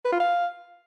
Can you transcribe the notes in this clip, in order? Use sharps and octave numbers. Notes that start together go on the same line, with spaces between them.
B4
F4
F5